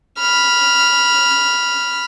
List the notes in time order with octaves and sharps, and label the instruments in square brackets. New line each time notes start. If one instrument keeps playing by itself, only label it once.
[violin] B5 F6